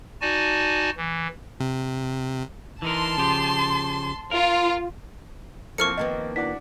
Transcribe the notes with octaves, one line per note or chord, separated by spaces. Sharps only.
D#4 F#4 D5 G#5 A5
E3
C3
E3 D#4 A#4 A5 C6
C#3 F3 G4
F4 A#4
F3 A#3 C4 E4 A4 C#6 F6 C#7
D#3 A#3 B3 D#5
D4 E4 F#4 D5 B6